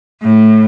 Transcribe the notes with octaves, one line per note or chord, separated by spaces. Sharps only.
A2